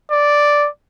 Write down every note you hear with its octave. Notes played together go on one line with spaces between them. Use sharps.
D5